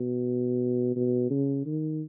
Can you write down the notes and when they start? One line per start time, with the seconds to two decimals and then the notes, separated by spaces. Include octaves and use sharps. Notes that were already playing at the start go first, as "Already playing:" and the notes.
Already playing: B2
0.96 B2
1.30 C#3
1.65 D#3